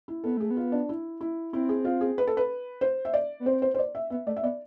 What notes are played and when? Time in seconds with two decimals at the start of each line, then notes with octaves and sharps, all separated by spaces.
0.08 E4
0.24 B3 A4
0.37 A3 G#4
0.51 B3
0.57 F4
0.72 D4
0.89 E4
1.21 E4
1.53 C4 E4
1.69 G#4
1.85 F4
2.01 G#4
2.18 B4
2.27 A4
2.37 B4
2.81 C5
3.05 E5
3.14 D5
3.40 B3
3.46 C4 C5
3.62 C5
3.75 C5
3.79 D5
3.95 E5
4.10 B3 E5
4.26 A3 D5
4.37 E5
4.42 B3 D5